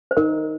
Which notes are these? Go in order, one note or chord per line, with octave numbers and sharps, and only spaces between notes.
C5
D#4 A#4